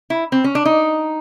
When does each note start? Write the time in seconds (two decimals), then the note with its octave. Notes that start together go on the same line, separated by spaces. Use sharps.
0.10 E4
0.32 C4
0.44 C#4
0.55 D4
0.65 D#4